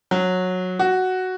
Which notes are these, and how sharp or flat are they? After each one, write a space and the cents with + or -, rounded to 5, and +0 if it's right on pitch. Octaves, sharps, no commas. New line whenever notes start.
F#3 -15
F#4 +5